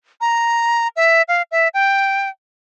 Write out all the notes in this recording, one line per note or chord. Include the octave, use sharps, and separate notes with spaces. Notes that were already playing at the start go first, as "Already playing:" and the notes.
A#5
E5
F5
E5
G5